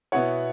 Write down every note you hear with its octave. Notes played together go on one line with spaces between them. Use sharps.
B2 B3 E4 C#5 F#5